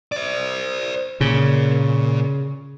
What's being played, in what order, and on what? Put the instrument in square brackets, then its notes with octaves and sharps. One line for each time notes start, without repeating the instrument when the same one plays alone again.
[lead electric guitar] C5 D5
[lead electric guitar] A#2 [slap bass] C#3